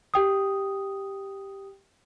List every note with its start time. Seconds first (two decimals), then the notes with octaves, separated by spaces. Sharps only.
0.14 G4 G5 D#6